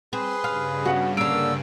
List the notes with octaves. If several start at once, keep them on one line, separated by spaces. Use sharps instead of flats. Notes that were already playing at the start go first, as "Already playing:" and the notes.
C4 G#4 B4 C6
G2 C#3 F5
B3 F#4 F#5
D3 A#3 E6 D7